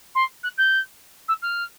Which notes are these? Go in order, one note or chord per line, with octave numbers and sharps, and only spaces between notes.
C6
F#6
G6
E6
F6